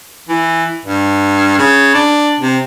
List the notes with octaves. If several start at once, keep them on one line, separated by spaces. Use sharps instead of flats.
E3
G2
C#3
D4
C3